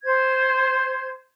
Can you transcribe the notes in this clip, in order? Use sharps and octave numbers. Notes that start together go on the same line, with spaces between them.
C5 G#6